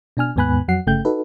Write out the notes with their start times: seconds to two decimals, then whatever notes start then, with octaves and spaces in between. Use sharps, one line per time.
0.17 B2 D4 G#5 F6
0.36 D#2 G#2 B3 G#5 B5 F#6
0.68 F2 F#3 F#5 C7
0.87 G1 C#3 A3 G5 G6
1.05 D#4 F#4 A4 B4